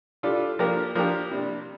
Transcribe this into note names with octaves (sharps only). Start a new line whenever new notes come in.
G3 D4 F4 A4 D5
F3 A#3 D4 G4 A#4
F3 A#3 D4 G4 A#4
C3 G3 D4